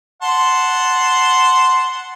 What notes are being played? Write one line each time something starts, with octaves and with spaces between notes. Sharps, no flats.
F#5 A5 C6